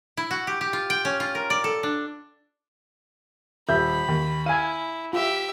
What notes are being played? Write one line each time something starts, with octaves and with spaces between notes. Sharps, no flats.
E4
F#4
G4
G4
F4
G5
C#4
F4
A#4
D5
A4
D4
D#1 E5 B5 G6
D#2
E4 F5 G#5 D#7
F4 G4 E5